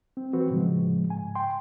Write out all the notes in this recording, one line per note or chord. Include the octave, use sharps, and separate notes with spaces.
C4
E3 C4 F#4 B4
A2 C#3 F3 G#3
G#2 G#5
G5 C6